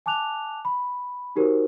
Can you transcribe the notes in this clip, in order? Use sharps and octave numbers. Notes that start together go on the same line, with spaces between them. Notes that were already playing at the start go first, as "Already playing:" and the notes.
G#5 A5 D6 F#6 F7
B5
D#4 F#4 G4 A#4 C5